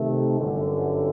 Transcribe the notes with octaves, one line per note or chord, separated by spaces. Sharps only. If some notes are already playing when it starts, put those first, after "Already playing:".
Already playing: C3 D#3 A3
G1 F#2 D3